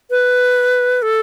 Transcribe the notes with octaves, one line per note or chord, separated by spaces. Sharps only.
B4
A4